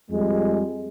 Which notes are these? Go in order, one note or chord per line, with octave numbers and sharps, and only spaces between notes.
F2 G3 G#3